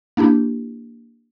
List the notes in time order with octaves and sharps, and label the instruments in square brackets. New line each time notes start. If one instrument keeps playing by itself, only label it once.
[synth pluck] A#3 D4 E4 G4